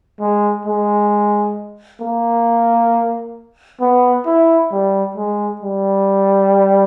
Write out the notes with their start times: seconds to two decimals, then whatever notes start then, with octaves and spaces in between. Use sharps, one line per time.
0.20 G#3
0.66 G#3
2.01 A#3
3.81 B3
4.26 E4
4.71 G3
5.16 G#3
5.61 G3